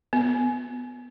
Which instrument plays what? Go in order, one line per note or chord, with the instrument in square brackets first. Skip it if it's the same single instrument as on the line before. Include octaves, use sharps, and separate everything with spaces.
[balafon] B3